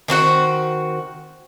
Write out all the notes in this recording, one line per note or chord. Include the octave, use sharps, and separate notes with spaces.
D#3 C4 F#4 F#5